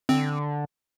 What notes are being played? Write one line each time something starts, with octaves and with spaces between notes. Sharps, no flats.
D3 C4